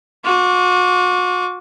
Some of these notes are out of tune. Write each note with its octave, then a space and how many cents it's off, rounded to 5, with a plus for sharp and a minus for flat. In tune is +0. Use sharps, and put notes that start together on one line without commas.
F#4 -40 D6 -40